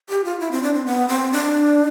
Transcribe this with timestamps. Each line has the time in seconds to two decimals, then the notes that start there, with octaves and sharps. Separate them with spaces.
0.09 G4
0.25 F4
0.40 E4
0.51 C4
0.63 D4
0.74 C4
0.86 B3
1.08 C4
1.33 D4